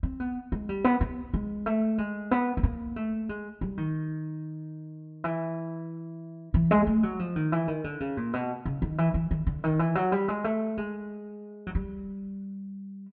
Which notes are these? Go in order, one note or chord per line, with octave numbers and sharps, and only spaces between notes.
C4
B3
G#3
G3
B3
B3
G#3
A3
G#3
B3
B3
A#3
A3
G#3
G3
D#3
E3
E3
G#3
A3
F#3
F3
D#3
E3
D#3
D3
C#3
A#2
B2
C#3
D#3
E3
E3
D#3
D3
D#3
E3
F#3
G3
G#3
A3
G#3
F#3
G3